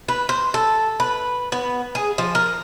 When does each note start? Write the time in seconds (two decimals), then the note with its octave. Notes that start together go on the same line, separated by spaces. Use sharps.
0.08 B4
0.29 C5
0.54 A4
1.00 B4
1.52 B3
1.95 G#4
2.18 F3
2.35 A#4